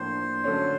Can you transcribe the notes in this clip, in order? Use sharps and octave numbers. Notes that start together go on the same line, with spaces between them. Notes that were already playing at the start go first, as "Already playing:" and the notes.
Already playing: A2 F3 A#3 D4 C5
D3 F#3 A3 C#4